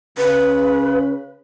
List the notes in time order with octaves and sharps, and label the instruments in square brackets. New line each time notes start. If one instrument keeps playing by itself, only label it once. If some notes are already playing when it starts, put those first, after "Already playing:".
[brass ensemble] C#3 [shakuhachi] B4